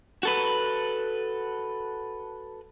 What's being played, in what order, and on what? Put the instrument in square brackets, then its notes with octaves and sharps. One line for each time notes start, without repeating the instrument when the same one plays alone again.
[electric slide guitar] F#4 A4 B4